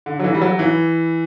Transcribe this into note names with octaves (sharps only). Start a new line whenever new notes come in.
D3
F#3
E3
G3
F#3
E3